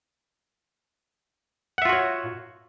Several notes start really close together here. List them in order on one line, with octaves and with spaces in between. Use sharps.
F#5 E5 F4 F#4 C#5